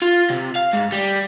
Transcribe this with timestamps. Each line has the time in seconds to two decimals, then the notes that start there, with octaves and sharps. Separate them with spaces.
0.02 F4
0.30 C3
0.55 F5
0.73 G#2
0.92 G3